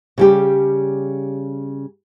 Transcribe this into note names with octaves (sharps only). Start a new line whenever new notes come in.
C#3 G3 G4